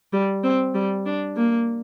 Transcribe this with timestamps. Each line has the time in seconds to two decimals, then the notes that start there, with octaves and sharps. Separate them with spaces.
0.13 G3
0.44 C4
0.75 G3
1.06 D4
1.36 A#3